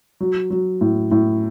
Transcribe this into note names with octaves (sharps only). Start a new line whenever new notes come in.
F#3
F#3
A2
A2